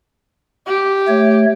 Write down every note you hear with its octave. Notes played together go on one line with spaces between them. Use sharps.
G4
A3 C#5